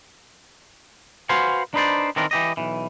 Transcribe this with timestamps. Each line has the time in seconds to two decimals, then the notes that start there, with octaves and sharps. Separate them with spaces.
1.29 F#4 B4 C5 F5 G#5
1.74 D4 D#4 B4 C5 D5
2.16 D#3 E3 C4 D4 A#4
2.31 E3 G4 D#5
2.57 B1 E3